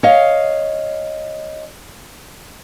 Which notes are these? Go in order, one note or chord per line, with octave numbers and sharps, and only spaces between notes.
C#5 D#5 F5